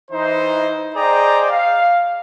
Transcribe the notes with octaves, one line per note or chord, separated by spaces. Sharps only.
E3 D#4 C5
G#4 C5 D5 D#5 G5 A#5
F5